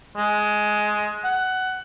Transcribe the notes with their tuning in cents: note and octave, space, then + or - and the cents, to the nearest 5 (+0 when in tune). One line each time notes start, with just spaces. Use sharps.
G#3 +15
F#5 +15